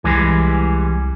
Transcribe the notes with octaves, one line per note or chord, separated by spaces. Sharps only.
C2 E3 G3 G#3